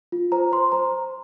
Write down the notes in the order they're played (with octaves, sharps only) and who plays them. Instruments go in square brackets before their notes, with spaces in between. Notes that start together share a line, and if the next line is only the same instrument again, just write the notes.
[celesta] F4
C5 A#5
C5 C6
C5 A#5